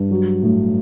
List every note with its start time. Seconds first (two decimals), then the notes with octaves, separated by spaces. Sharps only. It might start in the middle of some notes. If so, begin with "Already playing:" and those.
Already playing: G2
0.11 F#3
0.43 A2